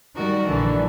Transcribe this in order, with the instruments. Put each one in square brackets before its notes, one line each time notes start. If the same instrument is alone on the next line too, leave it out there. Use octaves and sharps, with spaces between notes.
[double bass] D#3 [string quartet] G3 F#4 A#4
[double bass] A#1 E3 [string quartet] D3